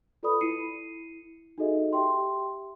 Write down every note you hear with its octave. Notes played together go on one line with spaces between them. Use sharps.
F4 A4 B4 D5 B5 D#6
E4 C7 C#7 D#7
D#4 F#4 G#4 A4 D#5 E5
G4 E5 G5 C6